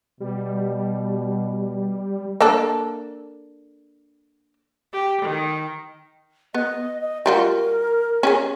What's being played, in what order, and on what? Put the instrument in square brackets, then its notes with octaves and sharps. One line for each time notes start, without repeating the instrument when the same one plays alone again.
[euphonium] B2 [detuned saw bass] G3
[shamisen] A#3 D4 A4
[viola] G4
D#3
[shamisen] B3 [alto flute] D#5
[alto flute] D#5
[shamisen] G3 F4 F#4 [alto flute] A#4
[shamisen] C#4 G4 G#4